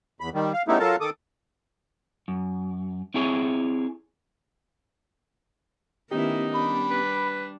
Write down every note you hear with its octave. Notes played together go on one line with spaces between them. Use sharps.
E2 B5
D#3 G3
F5
C#3 G3 A3 B3 D#4 E4
F#3 F4 A4 A#4 A5
D#3 A4 D6 D#6
F#2
C4 E4 G#4 C#5
D#3 A3 B3 C#4 D#4 E4 G4
G3 D4 B5
B4